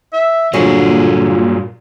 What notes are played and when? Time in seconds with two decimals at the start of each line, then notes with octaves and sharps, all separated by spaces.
0.13 E5
0.54 G2 A#2 D3 F3 F#3 G#4